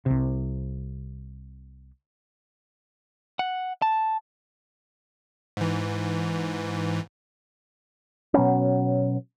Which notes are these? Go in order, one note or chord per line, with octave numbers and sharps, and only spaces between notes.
C2 C3
F#5
A5
G#2 E3
B2 F#3 B3 C#4